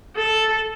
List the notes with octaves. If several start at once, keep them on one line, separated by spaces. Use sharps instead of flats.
A4